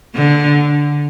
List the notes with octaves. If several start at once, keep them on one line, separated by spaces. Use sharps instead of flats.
D3